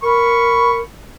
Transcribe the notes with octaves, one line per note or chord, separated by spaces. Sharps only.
A#4 B5 C#6